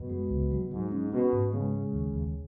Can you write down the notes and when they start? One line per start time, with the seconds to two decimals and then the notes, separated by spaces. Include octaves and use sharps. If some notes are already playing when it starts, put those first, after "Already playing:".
Already playing: F#2 B2
0.09 G#3
0.30 C#2
0.51 F#3
0.71 G#2 F#3
0.92 C#4
1.12 B2 C#4
1.32 G#2
1.53 C#3 G#3
1.73 G#3
1.94 D#2
2.14 D#2